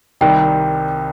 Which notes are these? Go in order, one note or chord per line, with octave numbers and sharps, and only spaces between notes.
C2 C3 D#3 G3 G5